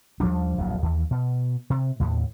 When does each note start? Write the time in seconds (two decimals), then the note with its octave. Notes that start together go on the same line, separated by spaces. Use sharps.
0.20 D#2 F3 G3 D4
0.58 D1 A#1 F2 F#3
0.83 D#2 E3
1.11 B2
1.70 C3
2.00 D#2 A2